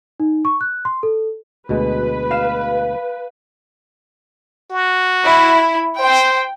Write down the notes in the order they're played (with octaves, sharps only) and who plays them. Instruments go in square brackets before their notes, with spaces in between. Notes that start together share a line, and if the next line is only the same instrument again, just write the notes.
[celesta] D#4
C#6
F#6
C6
A4
[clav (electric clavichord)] D2 B2 G#3 [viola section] B4
[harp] F5 E7
[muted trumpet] F#4
[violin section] E4
[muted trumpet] C5 [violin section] G5